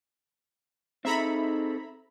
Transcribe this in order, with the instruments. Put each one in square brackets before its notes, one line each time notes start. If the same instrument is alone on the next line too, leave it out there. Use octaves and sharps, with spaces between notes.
[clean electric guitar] C4 G#4 A4 [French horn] D#4 [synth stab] E5 A#5 B5